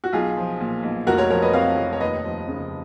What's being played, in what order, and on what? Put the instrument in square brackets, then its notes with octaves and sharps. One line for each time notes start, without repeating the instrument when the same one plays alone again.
[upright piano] F#4
B1 F4 G#4
F3
A#2
B1
F1 F#4 A#4
A#4 C#5
F3 A#4 C#5
B4 D#5
F2 C#5 F5
F1
C#5
D#2 B4 D#5
F3
C#3